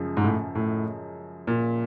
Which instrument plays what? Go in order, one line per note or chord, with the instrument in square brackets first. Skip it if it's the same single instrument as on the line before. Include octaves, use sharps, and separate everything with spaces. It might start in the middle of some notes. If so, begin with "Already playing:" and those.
Already playing: [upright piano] F#2 C#3 F3 G#3
[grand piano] G#2
A2
A2
A#2